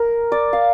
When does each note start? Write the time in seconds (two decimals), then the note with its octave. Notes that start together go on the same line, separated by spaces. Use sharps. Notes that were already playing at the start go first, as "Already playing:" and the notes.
Already playing: A#4
0.32 D5
0.53 F5